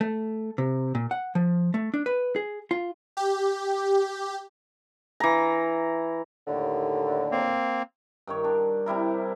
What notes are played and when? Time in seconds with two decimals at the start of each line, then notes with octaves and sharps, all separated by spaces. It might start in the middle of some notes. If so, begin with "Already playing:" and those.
0.01 A3
0.58 C3
0.95 A#2
1.11 F#5
1.35 F3
1.74 A3
1.94 D4
2.06 B4
2.36 G#4
2.71 F4
3.17 G4
5.20 E3 A#5
6.47 D#2 A2 D3
7.31 A#3 C4
8.27 G2 D#3 C#5
8.44 D4
8.86 C3 G3 E4 A#4